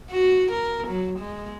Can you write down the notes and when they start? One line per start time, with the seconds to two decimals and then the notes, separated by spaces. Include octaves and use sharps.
0.10 F#4
0.51 A#4
0.87 F#3
1.19 G#3